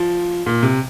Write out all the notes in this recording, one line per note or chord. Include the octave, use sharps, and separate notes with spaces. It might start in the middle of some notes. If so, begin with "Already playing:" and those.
Already playing: F3
A#2
C3